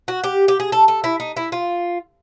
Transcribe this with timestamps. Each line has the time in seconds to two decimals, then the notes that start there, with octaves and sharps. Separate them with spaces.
0.08 F#4
0.24 G4
0.48 G4
0.60 G#4
0.72 A4
0.88 A4
1.04 E4
1.20 D#4
1.37 E4
1.52 F4